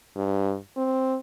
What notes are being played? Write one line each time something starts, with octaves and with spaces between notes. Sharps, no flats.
G2
C4